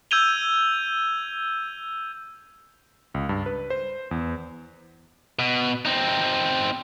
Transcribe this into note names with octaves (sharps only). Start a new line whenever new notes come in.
E6 G6 G#6 D#7 F7 G7
C#2
G2
B4
C5
E2
B2
C4 D#4